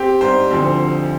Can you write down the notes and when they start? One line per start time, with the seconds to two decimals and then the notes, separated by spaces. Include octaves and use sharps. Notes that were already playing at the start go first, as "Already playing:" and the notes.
Already playing: C4 G4
0.21 G#2 G3 C4 C5
0.50 D2 D3 F3 C4